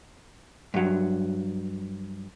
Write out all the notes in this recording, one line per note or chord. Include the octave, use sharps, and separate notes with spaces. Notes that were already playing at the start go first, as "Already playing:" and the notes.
G2 F#3